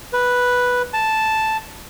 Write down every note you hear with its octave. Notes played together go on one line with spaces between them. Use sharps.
B4
A5